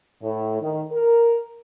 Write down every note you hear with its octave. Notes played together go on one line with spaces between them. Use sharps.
A2
D#3
A#4